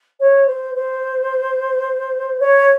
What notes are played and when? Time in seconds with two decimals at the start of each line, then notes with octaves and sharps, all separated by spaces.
0.20 C#5
0.47 C5
0.75 C5
2.40 C#5